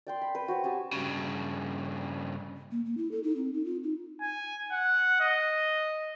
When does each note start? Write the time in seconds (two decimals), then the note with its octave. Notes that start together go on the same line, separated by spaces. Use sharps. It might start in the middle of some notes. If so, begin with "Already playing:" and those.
0.07 D5 G5 C6
0.21 B5
0.35 B4 G5
0.48 F#4 C5 C#5
0.64 G4 G#5 A5 D#6
0.93 G2 C#3
2.71 A#3
2.86 A#3
2.97 E4
3.11 A4
3.24 D#4
3.36 C4
3.54 D#4
3.65 F4
3.84 D#4
4.21 G#5
4.72 F#5
5.20 D#5